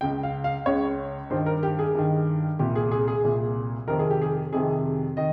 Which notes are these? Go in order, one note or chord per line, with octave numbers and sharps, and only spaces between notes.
C#2 C#3 G5
F5
F5
C#2 C#3 C#5
G2 D#3 C5
A#4
G4
G#4
G2 D#3
C2 A#2 G4
G#4
G#4
G#4
C2 A#2
F2 C3 D#3 A#4
G#4
G4
G#4
F2 C3 D#3 G#4
D#3 D#5